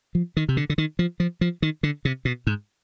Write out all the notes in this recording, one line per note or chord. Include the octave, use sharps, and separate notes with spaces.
F3
D#3
C3
D3
D3
D#3
F3
F3
F3
D#3
D3
C3
B2
G#2